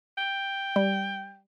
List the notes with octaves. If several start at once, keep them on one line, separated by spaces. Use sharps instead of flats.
G5
G3